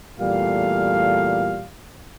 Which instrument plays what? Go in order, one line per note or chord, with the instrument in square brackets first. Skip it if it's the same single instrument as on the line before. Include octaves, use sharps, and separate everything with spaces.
[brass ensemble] E2 A#2 G3 A3 F5